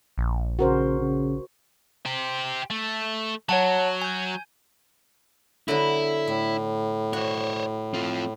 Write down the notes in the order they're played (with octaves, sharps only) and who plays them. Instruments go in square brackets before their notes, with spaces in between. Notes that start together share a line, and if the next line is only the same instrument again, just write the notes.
[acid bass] A#1
[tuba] C#3 [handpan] F#4 A#4 C5
[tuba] C#3
[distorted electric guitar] G4 C5
A3
[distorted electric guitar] F#3 [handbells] C#5 F#5 A5
[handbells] G#5 G6
[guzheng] D3 F#3 B3 [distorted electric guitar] E4
[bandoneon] A2 [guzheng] E5
[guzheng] F#4 [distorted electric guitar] C5 C#5
[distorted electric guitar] C4 F4